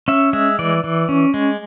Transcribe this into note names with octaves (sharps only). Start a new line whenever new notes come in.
C#4 E5
G#3 E5
E3 D5
E3
C#4
G#3